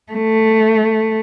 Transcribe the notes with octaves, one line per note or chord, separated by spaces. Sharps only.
A3